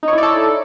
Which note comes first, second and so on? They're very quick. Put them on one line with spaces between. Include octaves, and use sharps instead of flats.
D#4 C#5 E4 D5 A4